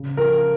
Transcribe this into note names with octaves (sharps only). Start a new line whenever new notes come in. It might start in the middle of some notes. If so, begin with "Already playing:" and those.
Already playing: C#3
F3 A#4